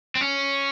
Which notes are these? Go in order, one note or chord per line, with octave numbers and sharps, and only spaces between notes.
C4
C#4